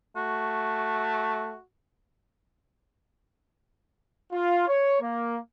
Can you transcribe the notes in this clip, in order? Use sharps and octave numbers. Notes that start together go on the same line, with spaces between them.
A3 F#4
F4
C#5
A#3